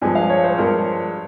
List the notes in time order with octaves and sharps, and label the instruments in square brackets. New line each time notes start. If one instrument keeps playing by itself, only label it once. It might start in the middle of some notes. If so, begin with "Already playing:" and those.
[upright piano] G2 F3 G#3 [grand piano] G#5
[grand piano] F5
C#5
C5
[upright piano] G2 F3 G#3 [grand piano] A#4